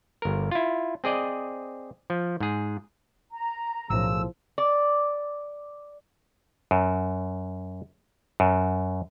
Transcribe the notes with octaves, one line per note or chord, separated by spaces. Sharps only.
G1 A#4
E4 F4
C4 G#4 D5 D#5
F3
G#2 G#4
A#5
B1 F#2 A2 C#3 F3 E6
D5
F#2
F#2